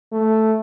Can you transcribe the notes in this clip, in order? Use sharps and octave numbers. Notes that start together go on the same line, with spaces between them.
A3